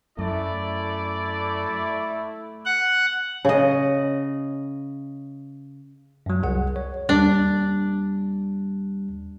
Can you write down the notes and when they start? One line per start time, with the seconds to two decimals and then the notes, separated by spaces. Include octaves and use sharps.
0.19 F#2 A3 E4 D5
2.65 F#5
3.45 C#3 D#5
6.26 F#2 F#3
6.43 C2 G#4 F#5
6.76 C#5
7.09 D#2 G3 D4